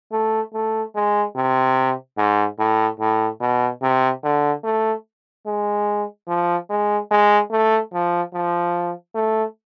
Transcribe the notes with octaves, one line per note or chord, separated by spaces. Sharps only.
A3
A3
G#3
C3
G#2
A2
A2
B2
C3
D3
A3
G#3
F3
G#3
G#3
A3
F3
F3
A3